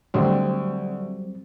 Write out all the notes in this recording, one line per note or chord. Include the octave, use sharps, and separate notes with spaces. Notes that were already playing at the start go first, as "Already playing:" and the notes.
D2 F#3 G3 C4